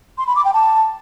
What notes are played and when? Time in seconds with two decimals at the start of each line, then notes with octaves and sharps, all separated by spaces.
0.18 C6
0.27 B5
0.36 D6
0.45 G5
0.54 A5